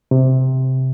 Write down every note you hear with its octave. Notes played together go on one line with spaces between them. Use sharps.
C3